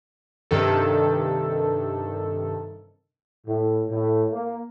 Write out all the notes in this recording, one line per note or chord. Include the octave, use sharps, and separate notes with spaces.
G2 C3 D#3 A4
A2
A2
A#3